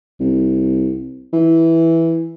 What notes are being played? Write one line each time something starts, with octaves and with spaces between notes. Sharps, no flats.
C2
E3